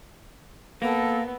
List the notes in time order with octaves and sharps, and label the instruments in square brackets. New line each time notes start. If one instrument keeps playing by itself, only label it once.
[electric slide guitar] A#3 [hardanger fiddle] B3 [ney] A4